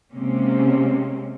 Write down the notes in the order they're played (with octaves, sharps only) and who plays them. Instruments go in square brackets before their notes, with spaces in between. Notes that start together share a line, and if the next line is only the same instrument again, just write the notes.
[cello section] C3 G#3 A#3 C4 C#4